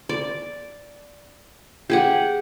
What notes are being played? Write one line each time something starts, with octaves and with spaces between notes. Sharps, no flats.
D5
G4 G#4 F#5